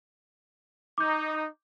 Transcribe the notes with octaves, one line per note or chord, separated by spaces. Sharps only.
D#4 D6 G6